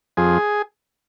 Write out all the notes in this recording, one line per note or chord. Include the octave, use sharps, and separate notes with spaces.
F2 G#4